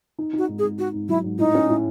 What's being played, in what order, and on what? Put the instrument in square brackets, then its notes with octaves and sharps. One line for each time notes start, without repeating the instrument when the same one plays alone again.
[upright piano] D#4
[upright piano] D#4 [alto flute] F#4
[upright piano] G#2
[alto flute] G#4
[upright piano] G#2
[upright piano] D#4 [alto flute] F#4
[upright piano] G#2
[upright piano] F#3 [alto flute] E4
[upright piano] G#2
[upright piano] A2 [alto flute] D#4
[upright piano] C#4
A2